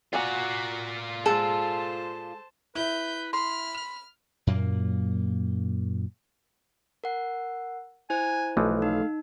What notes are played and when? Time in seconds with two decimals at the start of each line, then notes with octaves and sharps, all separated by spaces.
0.13 F4 F#4 D5 F#5 G#5 A#5
1.26 G#3 G#4 A4 C5 A5
2.75 E4 B4 E5 G6
3.33 B5 C6 F6
4.47 F#2 A#2 A#3
7.04 A#4 F#5
8.10 E4 C5 G#5
8.57 B1 E3 F3 A3
8.82 D#4 F5